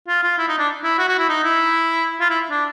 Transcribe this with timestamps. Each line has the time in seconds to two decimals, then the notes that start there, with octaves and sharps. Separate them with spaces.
0.08 F4
0.23 F4
0.38 E4
0.48 D#4
0.59 D4
0.84 E4
0.98 F#4
1.09 F#4
1.19 E4
1.29 D#4
1.44 E4
2.20 F4
2.30 E4
2.51 D4